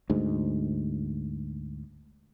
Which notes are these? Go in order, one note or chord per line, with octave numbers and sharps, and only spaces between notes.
D2 G#2